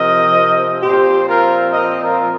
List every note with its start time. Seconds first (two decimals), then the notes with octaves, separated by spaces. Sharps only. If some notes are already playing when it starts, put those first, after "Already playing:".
Already playing: C3 F3 C4 A#4 D#5
0.83 A#2 F3 C4 G4 C5
1.27 F4 A#4
1.72 A#4 D#5
2.02 F4 A#4